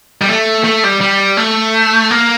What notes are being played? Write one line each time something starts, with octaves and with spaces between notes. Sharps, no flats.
G3
A3
A3
G3
G3
A3
A#3